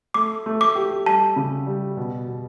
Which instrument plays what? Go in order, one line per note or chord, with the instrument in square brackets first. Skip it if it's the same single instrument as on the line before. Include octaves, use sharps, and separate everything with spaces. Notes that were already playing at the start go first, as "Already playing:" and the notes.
[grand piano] A3 [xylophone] D6
[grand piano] A3
[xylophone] D6
[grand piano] G4
[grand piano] G3 [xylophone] A5
[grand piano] C#3
G3
B2
B2